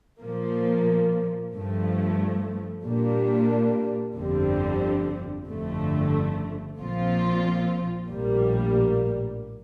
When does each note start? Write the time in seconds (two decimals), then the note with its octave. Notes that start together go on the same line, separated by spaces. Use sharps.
0.21 A#2 F3 A#3
1.53 G2 F3 A3
2.84 A#2 G3 A#3 D4
4.15 G1 F2 D3 G3 C4
5.47 G1 F2 D3 A3
6.78 A#1 A#2 F3 C4 F4
8.10 A#1 A2 G3 A#3